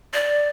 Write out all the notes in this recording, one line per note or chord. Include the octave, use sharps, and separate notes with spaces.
D5